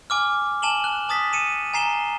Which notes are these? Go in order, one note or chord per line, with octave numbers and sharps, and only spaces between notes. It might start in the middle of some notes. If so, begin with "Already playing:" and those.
G#5 D6 F6
G#5 A5 E7 F#7 G7
F#6
A5 D#6 A6 B6
C#7 D#7 E7
G#5 A#5 C7 E7 G7